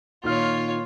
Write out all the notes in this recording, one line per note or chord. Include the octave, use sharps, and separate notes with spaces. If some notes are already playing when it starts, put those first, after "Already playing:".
A#2 D#3 F4 C#5 F6